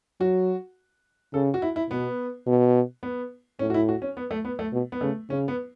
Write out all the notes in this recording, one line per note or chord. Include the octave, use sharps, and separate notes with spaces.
F#3 F#4
C#3 A4
F#4
E4
E4
B2 B3
B2
B3
A2 C#4
F#4
E4
F#4
C#4
B3
A3
B3
A3
B2
B3
C#3 A3
C#3 C#4
B3